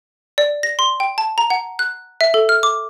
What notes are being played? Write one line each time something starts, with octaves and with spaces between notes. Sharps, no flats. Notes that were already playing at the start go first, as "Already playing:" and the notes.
D5
A#6
C6
G5
A5
A#5
F#5
F#6
E5
A4
F6
D6